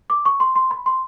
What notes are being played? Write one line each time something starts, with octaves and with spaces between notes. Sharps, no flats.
D6
C#6
C6
C6
B5
C6